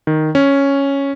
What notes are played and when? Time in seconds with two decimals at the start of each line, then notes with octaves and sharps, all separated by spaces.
0.07 D#3
0.35 C#4